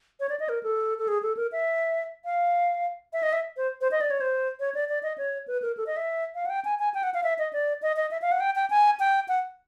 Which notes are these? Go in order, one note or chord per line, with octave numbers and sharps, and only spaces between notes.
C#5
D5
D#5
A#4
A4
A4
G#4
A4
A#4
E5
F5
E5
D#5
E5
C5
C5
D#5
D5
C#5
C5
C#5
D5
D5
D#5
C#5
B4
A#4
A4
D#5
E5
F5
F#5
G5
G#5
G#5
G5
F#5
F5
E5
D#5
D5
D#5
D#5
E5
F5
F#5
G5
G5
G#5
G5
F#5